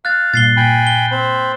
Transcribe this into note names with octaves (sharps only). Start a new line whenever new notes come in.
F5 F#6 A6
G2 A#2 A6 C7 G7
A#2 G5 G#5 B5
G7
C4 C5 B5